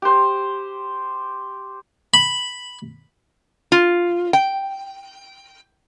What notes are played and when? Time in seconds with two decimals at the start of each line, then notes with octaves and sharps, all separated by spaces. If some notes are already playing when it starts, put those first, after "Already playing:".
0.02 G4 C5
2.14 B5
3.72 F4
4.33 G5